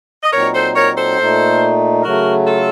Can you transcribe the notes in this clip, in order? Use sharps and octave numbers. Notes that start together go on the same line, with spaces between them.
D#5
A#2 F#3 C4 D#4 A#4 C#5
A4 C5
A#4 C#5
A4 C5
A#2 A3 D#4
C#3 F#3 A3 F#4 A#4
F4 A4